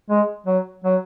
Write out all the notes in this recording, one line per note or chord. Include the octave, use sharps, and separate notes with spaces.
G#3
F#3
F#3